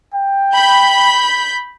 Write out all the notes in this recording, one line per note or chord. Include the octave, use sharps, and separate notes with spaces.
G5
B5 G6 B6